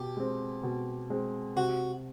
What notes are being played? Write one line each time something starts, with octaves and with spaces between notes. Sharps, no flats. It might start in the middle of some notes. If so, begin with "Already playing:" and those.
Already playing: B2 G4
G#3 C4
B2
G#3 C4
C3 F#4